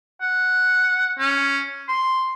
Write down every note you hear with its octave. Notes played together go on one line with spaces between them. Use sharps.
F#5
C#4
C6